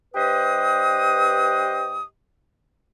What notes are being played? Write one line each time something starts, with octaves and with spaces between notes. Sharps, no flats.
G2 G4 B4 C5 D#5 D#6